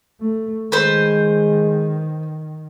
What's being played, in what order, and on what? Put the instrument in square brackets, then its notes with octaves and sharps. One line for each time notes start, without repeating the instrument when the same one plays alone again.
[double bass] A3
[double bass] D#3 [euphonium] G#3 [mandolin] B4 C5